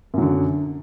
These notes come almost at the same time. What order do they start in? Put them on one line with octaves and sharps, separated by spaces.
F#2 F#3 D3